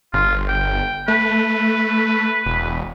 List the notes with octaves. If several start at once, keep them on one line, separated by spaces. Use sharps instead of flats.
G1 F4
G5
A3 B4
E1